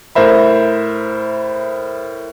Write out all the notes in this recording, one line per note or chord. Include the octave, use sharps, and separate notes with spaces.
A2 A#4 C5 E5 B5